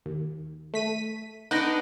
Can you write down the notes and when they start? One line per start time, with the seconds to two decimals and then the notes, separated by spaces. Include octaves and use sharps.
0.06 D#2
0.74 A3 B6 D#7
1.51 B3 D4 D#4 F#6 A#6 D7